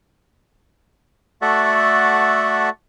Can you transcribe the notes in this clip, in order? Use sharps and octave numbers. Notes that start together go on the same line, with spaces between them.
A3 F#4 A4 D5 E5 F#5